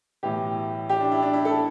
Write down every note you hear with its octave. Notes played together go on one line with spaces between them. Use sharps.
B1 A2 E3 G4
G4
D4
E4
D4
E4
A4